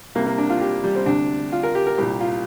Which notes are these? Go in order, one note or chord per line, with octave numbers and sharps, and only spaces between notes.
C2 C3 A#3
A#3
D4
F4
G4
G3
C4
D2 C3 D4
F4
A#4
G4
A#4
C2 A#2 G4
F4